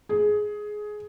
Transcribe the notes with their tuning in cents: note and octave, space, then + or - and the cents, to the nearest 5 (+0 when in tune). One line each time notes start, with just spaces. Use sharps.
G#4 +15